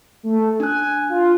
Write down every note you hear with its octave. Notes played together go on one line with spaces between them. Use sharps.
A3
D4 G#5 F#6
F4